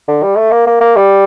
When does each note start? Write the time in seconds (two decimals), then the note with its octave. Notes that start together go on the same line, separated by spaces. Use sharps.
0.08 D3
0.22 G3
0.37 A3
0.51 A#3
0.67 A#3
0.81 A#3
0.96 G3